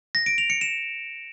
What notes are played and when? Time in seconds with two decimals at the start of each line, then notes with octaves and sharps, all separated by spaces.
0.15 A#6
0.26 D7
0.38 F7
0.50 C#7
0.61 E7